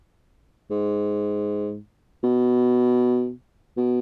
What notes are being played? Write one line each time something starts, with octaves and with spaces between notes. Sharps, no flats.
G#2
B2
B2